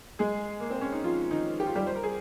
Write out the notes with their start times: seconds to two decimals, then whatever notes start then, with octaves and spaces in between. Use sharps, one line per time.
0.19 G#3 G#4
0.60 A#3
0.70 C4
0.81 C#4
0.92 D#4
1.03 F3 F4
1.31 D#3 D#4
1.60 G4
1.67 F4
1.75 G3 G4
1.87 C5
1.96 A#4
2.04 G#4